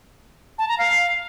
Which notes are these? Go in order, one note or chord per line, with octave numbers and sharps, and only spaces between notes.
A5
A#5
F5